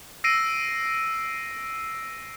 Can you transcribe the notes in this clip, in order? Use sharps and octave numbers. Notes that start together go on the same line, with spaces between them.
E6 A#6 C7 D7 D#7